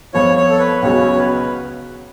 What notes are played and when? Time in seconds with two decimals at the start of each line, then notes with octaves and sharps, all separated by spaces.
0.13 F2 F3 B3 F4 C#5
0.37 C#5
0.50 A4
0.59 B4
0.82 C#2 C#3 F#3 B3 F#4 C#5
1.17 B4